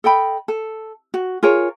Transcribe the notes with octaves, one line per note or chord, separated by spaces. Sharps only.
A4 D#5 G5 B5
A4
F#4
F4 G#4 A#4 C#5